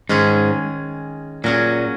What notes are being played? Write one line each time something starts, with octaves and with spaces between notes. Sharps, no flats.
G#2 D#3 G#3 C#4 G#4
A#2 F#3 C#4 G#4